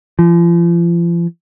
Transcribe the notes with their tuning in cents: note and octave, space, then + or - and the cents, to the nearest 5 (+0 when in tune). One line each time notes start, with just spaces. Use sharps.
F3 -40